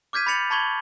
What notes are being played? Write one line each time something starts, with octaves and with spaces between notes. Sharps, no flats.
D6 F6 G6 G#6 B6 D#7
B5 G6 A6 C#7 F7 F#7
A5 B5 C#6 G#6 F#7 G7